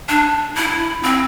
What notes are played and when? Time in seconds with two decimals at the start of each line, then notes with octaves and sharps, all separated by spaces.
0.09 D4
0.55 E4
1.03 C4